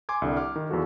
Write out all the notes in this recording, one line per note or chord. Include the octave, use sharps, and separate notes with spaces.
G#5 C6 D6 G#6
C2 D3 G3
D6 F6
D#3
E2 F3 F#4 A4